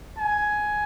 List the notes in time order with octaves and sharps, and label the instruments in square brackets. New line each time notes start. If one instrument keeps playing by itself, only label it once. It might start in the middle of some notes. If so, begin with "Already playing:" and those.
[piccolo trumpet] G#5